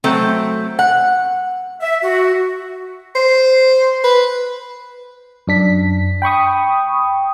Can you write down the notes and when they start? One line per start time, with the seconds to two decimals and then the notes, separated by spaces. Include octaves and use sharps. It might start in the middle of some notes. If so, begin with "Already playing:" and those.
0.04 F#3 A3 C4
0.79 F#5
1.80 E5
2.02 F#4
3.15 C5
4.04 B4
5.47 F#2 D4 B6
6.22 G5 B5 C#6 D#6